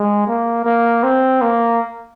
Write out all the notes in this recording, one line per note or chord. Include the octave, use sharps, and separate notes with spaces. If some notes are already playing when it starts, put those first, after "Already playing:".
Already playing: G#3
A#3
A#3
C4
A#3